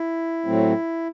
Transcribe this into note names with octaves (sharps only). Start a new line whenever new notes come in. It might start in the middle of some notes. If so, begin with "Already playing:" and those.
Already playing: E4
A2 F#3 A3 C4